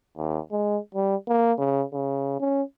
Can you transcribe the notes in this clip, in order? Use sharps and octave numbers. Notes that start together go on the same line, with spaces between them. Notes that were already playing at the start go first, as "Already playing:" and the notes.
D#2
G#3
G3
A#3
C#3
C#3
C#4